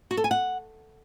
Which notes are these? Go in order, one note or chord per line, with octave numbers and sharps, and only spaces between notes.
F#4
A4
G#5
F#5